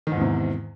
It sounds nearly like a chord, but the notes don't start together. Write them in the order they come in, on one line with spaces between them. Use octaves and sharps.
D#3 G#2 E2 C3